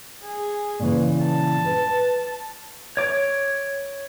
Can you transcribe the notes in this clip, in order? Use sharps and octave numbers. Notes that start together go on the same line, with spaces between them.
G#4
A#2 C#3 E3
A5
B4
C#5 D6